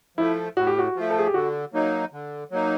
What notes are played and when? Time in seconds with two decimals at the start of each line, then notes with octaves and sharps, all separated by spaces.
0.17 F3 A3 E4
0.57 A2 F#4
0.67 G4
0.79 F#4
0.96 F3 A3
1.10 A4
1.19 G#4
1.27 G4
1.34 D3 F#4
1.73 F#3 A#3 D#4
2.13 D3
2.51 F#3 A#3 D#4